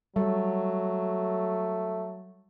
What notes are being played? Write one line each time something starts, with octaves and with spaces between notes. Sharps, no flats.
F#3 G3 A3